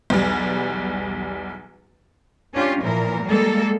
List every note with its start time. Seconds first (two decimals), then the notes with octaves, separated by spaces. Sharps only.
0.10 B1 E2 G3
2.54 C#4 D4 F4 G4
2.83 A#2 E3 F3 A#4
3.25 G3 G#3 A#3 A4